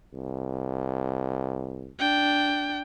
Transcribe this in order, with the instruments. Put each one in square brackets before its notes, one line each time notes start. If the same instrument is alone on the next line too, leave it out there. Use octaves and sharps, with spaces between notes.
[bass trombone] C2
[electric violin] D4 G5